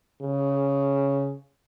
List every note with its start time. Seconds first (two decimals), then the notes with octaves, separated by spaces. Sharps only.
0.21 C#3